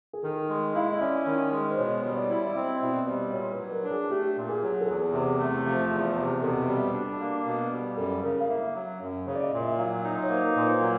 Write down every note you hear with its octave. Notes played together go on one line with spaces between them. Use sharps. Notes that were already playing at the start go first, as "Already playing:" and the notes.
G#4
D#3 A4
G#3
E4 F5
E5
D#5
C#4 D5
D#3
G#3
C5
B2 C#5
G3
C#5
D5
E4
D5
C4 D#5
B2 E5
D5
G3 D#5
A#2 C#5
B4
F#3
A#4
D4
G#4
A3 G4
A#2
G#4
F#3
A4
E2 G#4
C3
A3
F3
E2
C3
B2 A4
G3
D4
A#3
B2
G3
F#2 A4
C#3 A#4
F5
A#3 E5
F#3
F#2
C#3 C#5
D5
D#5
A#2 E5
E5
F#3 F5
D#4 E5
C#5
A#3 C5
A#4
B4
A#2
C5
F#3